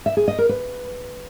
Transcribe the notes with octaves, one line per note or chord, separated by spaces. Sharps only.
E5
G#4
D#5
A#4
B4